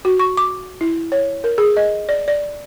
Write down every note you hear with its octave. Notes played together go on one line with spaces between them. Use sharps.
F#4
C#6
D6
E4
C#5
A#4
G#4
D#5
D5
D5